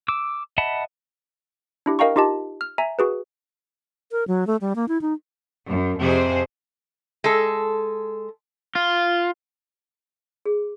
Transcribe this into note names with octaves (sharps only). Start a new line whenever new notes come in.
D6 E6
D#5 E5 F#5 A5 B5
D4 E4 G4
A#4 D#5 F5 G5 A#5 C#6
D#4 F4 G4 D#5 A5
F6
E5 G#5 A#5
F#4 G#4 B4
A#4
F#3
A3
G3
A#3
E4
D#4
F#2
F2 C3 G#4 C5
G#3 A4
F4
G#4